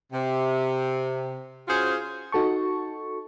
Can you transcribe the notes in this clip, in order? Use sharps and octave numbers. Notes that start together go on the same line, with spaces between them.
C3
C#4 F4 F#4 G#4 C5
D#4 F#4 A4 A5 C#6